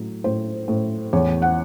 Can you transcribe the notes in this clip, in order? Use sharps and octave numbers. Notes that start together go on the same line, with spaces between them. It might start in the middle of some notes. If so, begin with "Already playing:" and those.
Already playing: A2 F#3
A2 C5
A2
E2 C#5
F#5